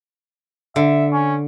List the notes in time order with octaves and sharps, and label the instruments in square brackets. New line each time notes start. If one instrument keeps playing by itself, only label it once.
[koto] D3 [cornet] E5
[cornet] C#4